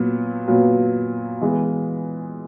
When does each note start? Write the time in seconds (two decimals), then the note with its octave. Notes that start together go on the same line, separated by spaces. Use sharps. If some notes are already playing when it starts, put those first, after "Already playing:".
Already playing: A#2 F#3 B3
0.48 A#2 F#3 B3
1.41 E3 G#3 B3